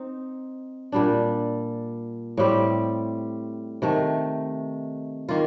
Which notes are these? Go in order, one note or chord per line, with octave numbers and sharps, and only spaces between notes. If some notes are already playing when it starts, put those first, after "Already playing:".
Already playing: C4 D#4
A#2 G3 D4
A2 G3 C4 G4
C3 D#3 A3
D#3 A#3 F4